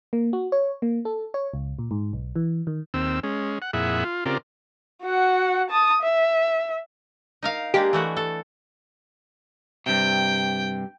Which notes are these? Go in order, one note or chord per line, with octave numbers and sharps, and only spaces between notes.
A#3
F#4
C#5
A#3
A4
C#5
C#2
A#2
G#2
B1
E3
D#3
D#2 C4 E6
G#3 C#4
F#5
F2 A#2 E4 G#4 E5 F#5
F4
C#3 C4 F4 G4 A#4 D5
F#4 F#5
A5 D#6
E5
D#4 A#4 F5
G#3 A#3 D4 G4
E3 A3 F#4
A4
G2 C3 G5